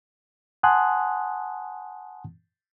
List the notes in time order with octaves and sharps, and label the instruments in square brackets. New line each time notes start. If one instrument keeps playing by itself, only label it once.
[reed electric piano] F#5 G#5 A5 C6 D#6 F#6